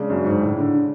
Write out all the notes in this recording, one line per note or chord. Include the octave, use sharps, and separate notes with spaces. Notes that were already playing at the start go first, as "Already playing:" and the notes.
Already playing: C#3 G#3 D4
F#2
G#2
A2
D3